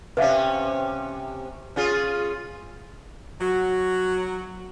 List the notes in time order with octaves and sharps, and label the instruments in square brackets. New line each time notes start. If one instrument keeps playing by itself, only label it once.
[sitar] C3 C#4 [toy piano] B4 E5 F5
[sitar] C#4 F4 G#4
[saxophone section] F#3 F#4